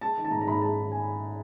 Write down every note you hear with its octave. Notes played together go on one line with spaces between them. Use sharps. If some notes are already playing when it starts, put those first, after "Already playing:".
G#3 A5
D#3
A5
G#2 A#5
A#5
G#2 B5
A#5
G#3 A5
D#3
G#5